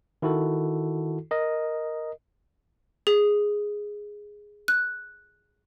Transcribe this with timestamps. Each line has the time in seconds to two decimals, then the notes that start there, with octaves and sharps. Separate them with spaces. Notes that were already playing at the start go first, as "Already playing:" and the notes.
0.22 D#3 E4 F#4 A4
1.31 A#4 D#5
3.07 G#4
4.68 F#6